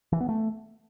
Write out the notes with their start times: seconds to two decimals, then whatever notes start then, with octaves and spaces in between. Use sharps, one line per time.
0.12 E3
0.21 B3
0.29 A3